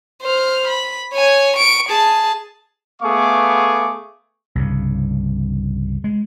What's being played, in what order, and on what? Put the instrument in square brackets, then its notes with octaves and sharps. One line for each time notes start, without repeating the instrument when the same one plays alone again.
[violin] C5 F6
B5
C#5 G#5
C#6 D7
G#4 A5
[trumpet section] A3 B3 G#4 F5 C#6 D6
[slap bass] C2 G2 C#3
G#3